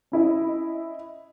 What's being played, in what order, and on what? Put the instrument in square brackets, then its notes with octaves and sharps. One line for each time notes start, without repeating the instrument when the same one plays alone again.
[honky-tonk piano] C#4 E4 D#5